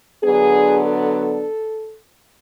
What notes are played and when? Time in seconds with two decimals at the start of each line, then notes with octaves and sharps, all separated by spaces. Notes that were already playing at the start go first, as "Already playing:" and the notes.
0.23 D3 F#3 B3 D4 G#4
0.85 A4